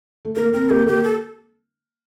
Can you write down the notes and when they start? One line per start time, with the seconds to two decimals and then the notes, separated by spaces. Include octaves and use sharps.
0.25 A3
0.36 A#3 A#4
0.53 C4 A#4
0.70 A#3 G4
0.86 A#3 G4
1.04 A4